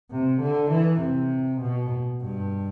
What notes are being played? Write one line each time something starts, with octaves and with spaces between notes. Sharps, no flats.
C3
D3
E3
C3
B2
G2